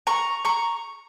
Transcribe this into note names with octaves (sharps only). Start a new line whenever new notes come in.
A#5 C#6
A#5 C#6